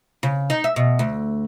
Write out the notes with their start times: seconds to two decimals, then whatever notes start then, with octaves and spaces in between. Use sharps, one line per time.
0.23 C#3
0.50 D#4
0.64 E5
0.76 B2
0.99 D2